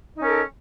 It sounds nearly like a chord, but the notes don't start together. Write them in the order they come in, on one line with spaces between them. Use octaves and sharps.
D#4 C#4 A#4 A4